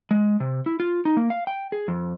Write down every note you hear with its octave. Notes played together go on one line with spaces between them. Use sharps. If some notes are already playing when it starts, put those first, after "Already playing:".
G#3
C3
E4
F4
D#4
A#3
F5
G5
G#4
F2